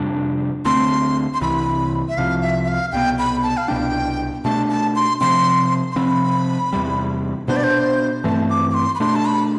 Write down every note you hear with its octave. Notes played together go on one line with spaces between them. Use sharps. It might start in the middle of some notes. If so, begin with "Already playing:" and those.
Already playing: F2 C3 G3 D4
D2 D3 A3 C4 C6
C6
C2 C3 E3 B5
E5
C2 C3 F3 F5
E5
E5
F5
C2 B2 B3 G5
B5
A5
F5
C2 B2 B3 D4 G5
B2 A3 D4 A5
A5
C6
C3 F3 C4 C6
C6
C3 F3 C4 B5
E2 C3 G3
B2 B3 D4 C5
D5
C5
G2 E3 A3 C4 A5
D6
D6
C6
B5
B2 A3 D4 C6
A5
B5